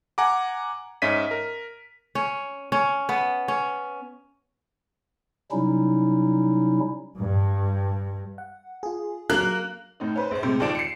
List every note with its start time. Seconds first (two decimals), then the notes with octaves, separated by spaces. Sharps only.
0.18 F#5 G#5 A#5 D6
1.02 G#2 C#4 D#5 E5 B6 D#7
1.31 A#4
2.15 C#4
2.72 C#4
3.09 B3
3.48 C#4
5.52 C3 F#3 G3 C#4 D#4 E4
7.19 G2
8.38 F#5
8.83 F4 G#4
9.30 F#3 A#3 A#4 F#6
10.00 A2 D#4
10.16 C#4 B4 C5
10.31 A#1 C5
10.43 C3 G#3 A3
10.60 D#2 F3 D#4 D5 D7 E7
10.75 C7 C#7